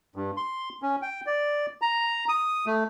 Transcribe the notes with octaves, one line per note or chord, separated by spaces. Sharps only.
G2
C6
C#4
G5
D5
A#5
D#6
A3